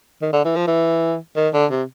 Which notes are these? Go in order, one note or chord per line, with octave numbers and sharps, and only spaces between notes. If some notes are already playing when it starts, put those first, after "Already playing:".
D#3
D3
E3
F3
E3
D#3
D3
C3